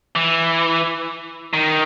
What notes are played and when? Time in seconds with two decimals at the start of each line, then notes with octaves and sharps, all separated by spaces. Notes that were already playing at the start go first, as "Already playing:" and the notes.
0.15 E3
1.53 D#3